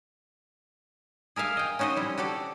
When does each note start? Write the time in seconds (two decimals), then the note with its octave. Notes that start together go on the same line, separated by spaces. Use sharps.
1.36 G#4 A#4 E5 F5 G#5
1.57 D#5 G5
1.79 C#4 D#4 F#4 C5 D#5
1.97 G3 E4
2.18 F#4 G4 A4 D5